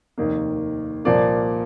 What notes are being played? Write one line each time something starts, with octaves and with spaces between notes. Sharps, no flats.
F1 D#2 D#3 A#3
C2 A#2 F3 A#3 D5